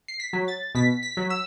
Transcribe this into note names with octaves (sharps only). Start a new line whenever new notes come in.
C7
B6
F#3
A6
B2 B6
B6
F#3
E6